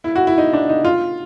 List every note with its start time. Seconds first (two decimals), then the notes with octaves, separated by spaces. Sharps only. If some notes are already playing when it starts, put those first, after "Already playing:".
0.04 E4
0.16 F#4
0.27 E4
0.38 D#4
0.53 D4
0.69 D#4
0.85 F4